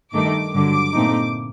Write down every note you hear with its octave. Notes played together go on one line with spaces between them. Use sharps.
G2 D#3 A3 D#4 D6
G2 D3 F#3 D6
A#2 A3 C4 D#4